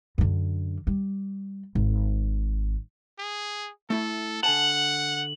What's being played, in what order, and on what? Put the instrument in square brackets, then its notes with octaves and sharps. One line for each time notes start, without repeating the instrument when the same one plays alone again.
[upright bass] F#2 D3
G3
G#1
[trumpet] G#4
[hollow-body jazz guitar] A3 E4 [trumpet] A4
[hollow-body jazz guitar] D3 G#5 A5 [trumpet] F#5 [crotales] F#7